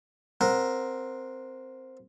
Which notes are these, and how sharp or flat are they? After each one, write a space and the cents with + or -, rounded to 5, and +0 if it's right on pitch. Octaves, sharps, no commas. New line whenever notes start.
C4 +0 A#4 +0 F#5 -20